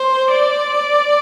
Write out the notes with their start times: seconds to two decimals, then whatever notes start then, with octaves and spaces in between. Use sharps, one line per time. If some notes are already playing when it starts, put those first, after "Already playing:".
Already playing: C5
0.31 D5